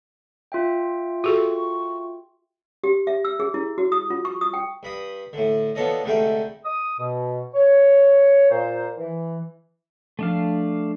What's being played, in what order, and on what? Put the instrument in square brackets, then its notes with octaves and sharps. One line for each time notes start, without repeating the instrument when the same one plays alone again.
[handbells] F4 E5 G5
[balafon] F#4 G#4 A4 [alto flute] C#6
[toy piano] G4
E5
E6
G#4
E4
F#4
D#6
F4
C#6
D#6
G5
[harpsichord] G2 B5 D#6
A2 D3
F3 B3 D4 A4 C#5 D#5
C2 G#2 D3 G3 A3 G5
[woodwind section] D#6
B2
C#5
A#2 C5
E3
[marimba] F3 [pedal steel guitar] A3 D4 F5